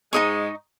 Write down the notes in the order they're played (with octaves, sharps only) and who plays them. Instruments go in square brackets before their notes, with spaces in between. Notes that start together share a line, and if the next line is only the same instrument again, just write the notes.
[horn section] G#2 G#3 [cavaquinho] D#4 G#4 D#5 C#6